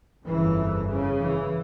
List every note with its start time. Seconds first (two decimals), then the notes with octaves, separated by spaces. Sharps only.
0.24 G1 F2 C#3 E3
0.88 C#3
1.21 E3